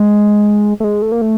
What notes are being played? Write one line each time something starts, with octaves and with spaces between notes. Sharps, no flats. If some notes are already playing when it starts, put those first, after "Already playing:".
Already playing: G#3
A3
G#3
A3
A#3
A3